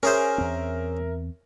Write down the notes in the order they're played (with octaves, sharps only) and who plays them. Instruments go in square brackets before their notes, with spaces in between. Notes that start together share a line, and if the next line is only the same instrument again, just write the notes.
[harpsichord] C#4 G#4 C5 [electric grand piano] A#4 E5
[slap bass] E2 C4